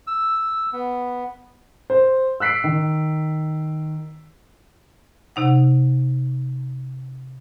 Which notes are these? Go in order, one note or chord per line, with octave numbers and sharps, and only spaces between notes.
E6
B3
C5
E6 F#6 B6 C7 D7
D#3
C3 D#4 F#5